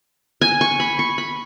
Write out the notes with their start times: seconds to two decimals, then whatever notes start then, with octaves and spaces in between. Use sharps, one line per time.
0.41 G#5
0.61 C#6
0.80 B5
0.99 C#6
1.18 B5